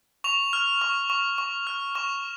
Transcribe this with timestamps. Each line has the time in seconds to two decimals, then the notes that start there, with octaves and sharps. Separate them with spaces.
0.24 C#6 F7
0.53 F6
0.82 C#6
1.10 C#6
1.38 C#6
1.67 F6
1.95 C#6 E7